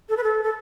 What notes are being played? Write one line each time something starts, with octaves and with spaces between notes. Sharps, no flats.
A4
B4
A4
A4